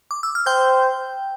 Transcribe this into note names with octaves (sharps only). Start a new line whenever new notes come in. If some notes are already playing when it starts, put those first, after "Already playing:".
D6
E6
F6
C5 G5 G6